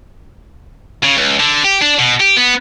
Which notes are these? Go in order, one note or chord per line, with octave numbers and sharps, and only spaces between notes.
C#3
C#2
D3
G4
D4
B2
G4
B3